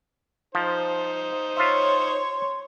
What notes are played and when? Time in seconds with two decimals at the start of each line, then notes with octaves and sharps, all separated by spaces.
0.55 F3 D#4 C5
1.57 F4 C#5 E5 C6